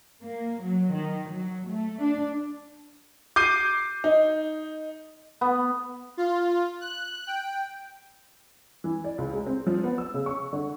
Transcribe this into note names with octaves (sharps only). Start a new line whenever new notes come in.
A#3
F#3
D#3
F#3
A3
D4
D6 G6 C7 D#7
D#4
B3
F4
F#6
G5
E3
D5
C#2
G#3
C4
F3
B3
E6
C#3
C#6
D3